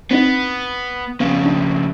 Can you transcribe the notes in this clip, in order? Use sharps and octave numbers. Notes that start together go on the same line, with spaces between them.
B3 C4 D4 D#4
F2 C#3 B3 F5
D4